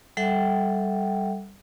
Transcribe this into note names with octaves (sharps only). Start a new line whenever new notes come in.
G3 A4 E5 F#5 G5